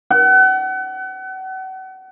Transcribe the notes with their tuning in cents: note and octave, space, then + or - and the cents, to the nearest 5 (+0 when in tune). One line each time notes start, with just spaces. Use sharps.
F#5 +35